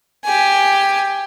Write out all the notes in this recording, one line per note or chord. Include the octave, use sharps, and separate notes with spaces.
G4 G#5